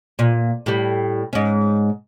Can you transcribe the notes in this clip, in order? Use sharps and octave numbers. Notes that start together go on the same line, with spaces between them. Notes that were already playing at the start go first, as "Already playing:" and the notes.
A#2
A2 G3
G#2 C#4